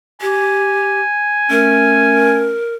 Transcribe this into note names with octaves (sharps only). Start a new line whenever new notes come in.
G4 G#5
A3 C#4 A#4